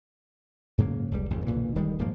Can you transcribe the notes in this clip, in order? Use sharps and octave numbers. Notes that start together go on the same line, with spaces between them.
G#2 C#3 F#3 A#3
F1 C#2 G3
G#1 F2 G#2 C#3
B1 A#2 D3 E3
D1 D#3 G3 G#3
D#1 G#2 F3 A#3